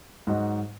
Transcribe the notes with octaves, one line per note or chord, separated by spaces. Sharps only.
G#2 F#3 D#4 F#4 D#5